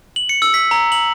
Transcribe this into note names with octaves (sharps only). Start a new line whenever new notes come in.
F#7
C#7
E6
B6
A#5
F#7